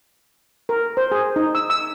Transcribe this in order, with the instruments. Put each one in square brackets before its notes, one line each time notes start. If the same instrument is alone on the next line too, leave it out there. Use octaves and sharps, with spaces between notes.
[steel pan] A#4
C5
G#4
D#4
E6
E6